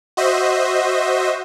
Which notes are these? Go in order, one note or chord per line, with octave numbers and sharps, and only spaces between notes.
F#4 C5 D#5 E5